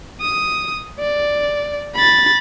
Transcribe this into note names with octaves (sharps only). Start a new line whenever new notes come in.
D#6
D5
B5 A6